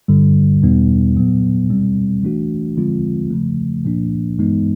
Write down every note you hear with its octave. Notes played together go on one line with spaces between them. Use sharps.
G2 D3 G3
E2 B2 G3 B3 D#4
A#2 F#3 B3
B2 G3 C4
E3 A3 D4 F#4
D3 F3 G#3 C4 F4
C#3 F3 A3
A#2 F3 A#3 D4
G2 E3 G#3 B3 D#4